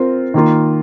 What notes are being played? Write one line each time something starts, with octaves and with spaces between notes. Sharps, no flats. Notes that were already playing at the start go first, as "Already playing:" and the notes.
Already playing: C4 F4 A#4
D#3 A#3 F4